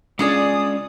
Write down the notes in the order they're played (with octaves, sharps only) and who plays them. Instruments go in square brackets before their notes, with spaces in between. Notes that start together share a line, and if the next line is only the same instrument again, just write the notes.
[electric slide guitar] G#3 C#4 F4 [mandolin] D4 G#4 D5 [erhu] D#6